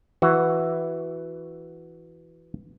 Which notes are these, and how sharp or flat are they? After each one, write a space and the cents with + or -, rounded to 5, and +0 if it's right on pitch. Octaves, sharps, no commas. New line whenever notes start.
E3 +0 F#4 +0